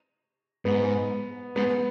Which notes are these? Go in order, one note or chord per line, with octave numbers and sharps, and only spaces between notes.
G#2 B3
G#2 B3